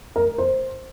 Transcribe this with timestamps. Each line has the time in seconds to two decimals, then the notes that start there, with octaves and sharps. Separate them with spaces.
0.16 A#4
0.38 C5